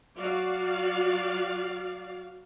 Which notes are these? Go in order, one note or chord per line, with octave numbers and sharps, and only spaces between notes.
F#3 F#4 D5 F5